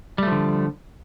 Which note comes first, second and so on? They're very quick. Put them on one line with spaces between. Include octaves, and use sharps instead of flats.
G3 A3 F3 D3